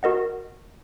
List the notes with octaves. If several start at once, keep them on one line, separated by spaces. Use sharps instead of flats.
F#4 A#4 D#5 F#5